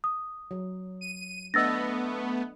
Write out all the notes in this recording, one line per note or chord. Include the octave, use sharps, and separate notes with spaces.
D#6
F#3
D#7
A3 B3 D4 D#5 E6 A6 A#6